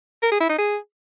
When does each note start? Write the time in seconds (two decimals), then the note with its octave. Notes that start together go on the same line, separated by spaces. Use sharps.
0.23 A#4
0.32 G#4
0.40 E4
0.49 D#4
0.58 G#4